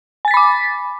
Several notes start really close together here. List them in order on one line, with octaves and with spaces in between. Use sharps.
G#5 A6 B6 B5 D6